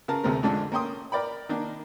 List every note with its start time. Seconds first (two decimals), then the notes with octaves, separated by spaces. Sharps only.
0.08 C#3 A#4 A5
0.23 D2 C3 G#3 A3 C4 A#4
0.43 F2 G#2 D3 A3 C#4 D4
0.72 A#3 C#4 G5 C6 D#6
1.12 A#4 D5 G5 B5
1.49 D#3 A#3 D4